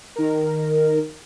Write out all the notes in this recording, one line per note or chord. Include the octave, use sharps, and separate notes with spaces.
D#3 A#4